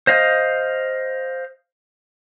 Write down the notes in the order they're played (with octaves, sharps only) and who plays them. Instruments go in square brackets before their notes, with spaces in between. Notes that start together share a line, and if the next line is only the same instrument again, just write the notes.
[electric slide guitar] C5 D#5 F5